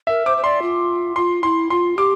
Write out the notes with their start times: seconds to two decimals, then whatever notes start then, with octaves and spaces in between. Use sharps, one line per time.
0.07 A#4 E5
0.25 C5 D6
0.37 C5
0.44 D5 C6
0.62 F4
1.16 F4 C6
1.43 E4 C6
1.70 F4 C6
1.97 G4 D6